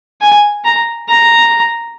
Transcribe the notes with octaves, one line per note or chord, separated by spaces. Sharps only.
G#5
A#5
A#5